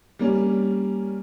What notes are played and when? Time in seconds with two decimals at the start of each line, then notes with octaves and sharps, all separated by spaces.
0.19 G3 A#3 C#4